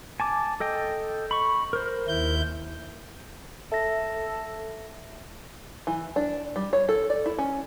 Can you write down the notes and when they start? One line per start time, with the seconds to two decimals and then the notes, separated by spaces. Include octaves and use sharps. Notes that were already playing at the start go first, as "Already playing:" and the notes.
0.20 G#5 A5 D6
0.60 A4 D#5 G5
1.31 B5 C#6
1.73 A#4 C5
2.08 D#2 E4 G6
3.72 A4 E5 A#6
5.87 E3
6.16 D4
6.56 G3
6.73 C#5
6.89 A4
7.10 D5
7.26 E4
7.39 C#4